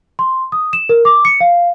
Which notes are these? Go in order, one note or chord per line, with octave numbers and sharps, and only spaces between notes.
C6
D#6
E7
A#4
D6
C#7
F5